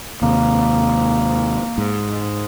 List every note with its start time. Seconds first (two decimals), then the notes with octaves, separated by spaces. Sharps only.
0.22 D#2 C3 A#3
1.78 G#2